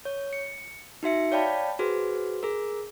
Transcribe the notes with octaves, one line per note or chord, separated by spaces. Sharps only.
C#5
C#7
D#4 F#4 E5 C#7
C#5 D5 F5 G5 A5 B5
F#4 G#4 B4 C5
G#4 A#4